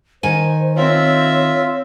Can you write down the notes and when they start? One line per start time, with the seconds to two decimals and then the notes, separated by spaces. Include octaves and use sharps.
0.23 D#3 C5 G#5
0.76 C4 F4 C#5 E5